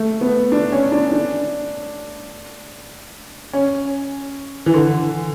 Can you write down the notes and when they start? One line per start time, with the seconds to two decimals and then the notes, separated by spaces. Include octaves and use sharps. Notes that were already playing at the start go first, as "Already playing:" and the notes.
Already playing: A3
0.21 B3
0.52 D4
0.72 C#4
0.92 D4
1.12 D4
3.53 C#4
4.66 E3
4.74 D3